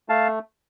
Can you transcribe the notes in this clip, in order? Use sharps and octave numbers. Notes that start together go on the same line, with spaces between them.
A3 F5 A5